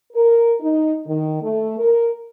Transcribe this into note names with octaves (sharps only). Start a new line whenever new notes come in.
A#4
D#4
D#3
A3
A#4